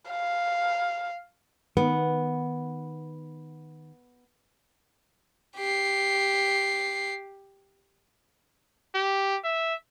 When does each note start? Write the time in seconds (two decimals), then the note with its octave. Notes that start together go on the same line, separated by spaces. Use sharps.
0.11 F5
1.77 D#3 B3
5.56 G4 C7
8.95 G4
9.44 E5